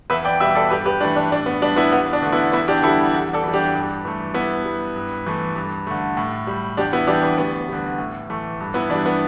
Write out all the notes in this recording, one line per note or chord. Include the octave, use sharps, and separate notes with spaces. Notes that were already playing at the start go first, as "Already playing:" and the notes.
E2 B4 E5
D5 G5
B2 G3 B4 E5
A4 D5
G2 G4 B4
G4 B4
E3 A3 D4
D4
A2 D4
B3
G3 D4
B3 E4
E2 B3
D4
D3 A3
B3 E4
E2 B3 E4
D4 G4
D3 G3 E4 A4
E2
A4 D5
E3 G3
D4 G4
G2
E3 A3
G2 B3 E4
G3
G2
E3 A3
G2
D3 A3
A2
G3
E2 D4 G4
B3 E4
E3 G3 D4 G4
B3
D2 B3
D3 G3
A2
E3 A3
G2
B3 E4
E3 G3 D4
B3